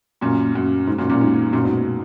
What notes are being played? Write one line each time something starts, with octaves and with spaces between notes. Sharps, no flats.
F#2 A#2
F#2
G#2
F#2 A#2
F#2 A#2
G#2
F#2 A#2
G#2 B2